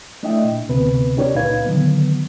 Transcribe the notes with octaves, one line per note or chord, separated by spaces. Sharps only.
A3 D4 E4 D#5 E5 G5
A#2
D2 C3 B3 B4
C#4 D#4 G4 A#4 C#5 D5
C#2 A#2 D#4 B4 F5 G#6
D3 D#3 F#3 B3